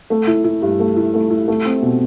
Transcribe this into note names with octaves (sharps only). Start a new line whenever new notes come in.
A3
E4
E4
G2
A3
E4
A3
E4
A3
C4
B2